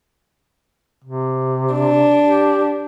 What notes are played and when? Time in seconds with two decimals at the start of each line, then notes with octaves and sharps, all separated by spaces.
1.04 C3
1.72 D4
2.24 G4